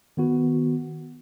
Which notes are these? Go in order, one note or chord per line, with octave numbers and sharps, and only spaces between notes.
D#3 B3 F#4